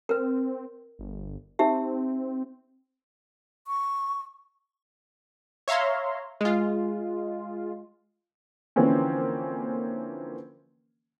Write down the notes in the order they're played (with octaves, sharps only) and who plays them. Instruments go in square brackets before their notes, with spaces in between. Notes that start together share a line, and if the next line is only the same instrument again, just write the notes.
[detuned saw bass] C4 [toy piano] A#4 B4
[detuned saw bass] G1
[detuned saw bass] C4 [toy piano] D#4 G4 E5
[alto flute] C#6
[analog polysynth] C#5 E5 F5 A#5 C6
G#3 F4
[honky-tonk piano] D3 E3 F3 A#3 C4 C#4